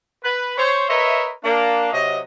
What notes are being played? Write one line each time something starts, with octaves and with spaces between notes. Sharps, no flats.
B4
C5 C#5
A#4 B4 C#5 D#5 E5
A#3 D4
C3 F#3 D#5